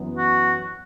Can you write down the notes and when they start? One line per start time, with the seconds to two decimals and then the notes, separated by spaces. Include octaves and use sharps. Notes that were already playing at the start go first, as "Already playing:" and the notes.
Already playing: F#2 E3 B3
0.17 F#4